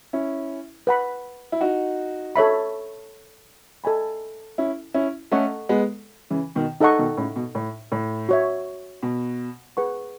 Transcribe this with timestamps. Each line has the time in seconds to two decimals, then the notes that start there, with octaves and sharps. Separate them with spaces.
0.13 C#4 E4
0.87 B4 F#5 B5
1.52 E4
1.61 D#4 F#4
2.36 A4 C#5 E5 B5
3.84 A4 D#5 G#5 B5
4.58 C#4 E4
4.94 C#4 E4
5.32 A3 C#4 A4 D#5 F#5 C#6
5.69 G#3 B3
6.30 C#3 E3
6.55 B2 D#3
6.80 D#4 A4 D#5 F#5 C#6
6.99 B2 D#3
7.17 A2 C#3
7.36 B2
7.55 A2
7.92 A2
8.29 F#4 C#5 E5
9.03 B2
9.77 G#4 B4 F#5 C#6